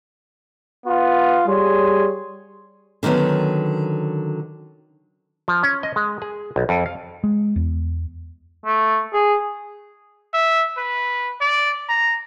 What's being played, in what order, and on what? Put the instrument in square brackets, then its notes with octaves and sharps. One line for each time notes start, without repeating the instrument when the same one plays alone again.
[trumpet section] B3 F4
[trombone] G3 [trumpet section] G#4 C#5 C6
[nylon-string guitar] D3 D#3 F#3 B3 C#4
[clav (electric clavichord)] F3
C#4
D#5
G#3
G#4
B1
F2
F5
[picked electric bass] G#3
E2
[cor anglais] A3
G#4
[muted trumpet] E5
B4
D5
A#5